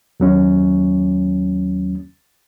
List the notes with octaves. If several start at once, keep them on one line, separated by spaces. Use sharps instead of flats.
D#2 F#3 C#4